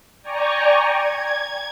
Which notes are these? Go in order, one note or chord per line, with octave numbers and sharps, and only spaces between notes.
D5 G5 G#5 A#5 C#6
G#6